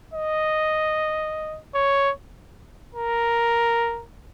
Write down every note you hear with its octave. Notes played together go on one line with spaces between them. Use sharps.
D#5
C#5
A#4